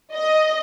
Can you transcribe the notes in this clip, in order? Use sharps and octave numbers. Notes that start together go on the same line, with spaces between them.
D#5